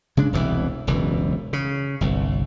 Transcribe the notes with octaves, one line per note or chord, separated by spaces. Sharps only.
C#3 G#3 D4
E1 C2 B2 E3
E1 C#2 F#2 E3
C#3
G1 C2